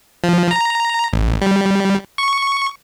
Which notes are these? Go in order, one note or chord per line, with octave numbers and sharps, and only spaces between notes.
F3
A#5
A1
G3
C#6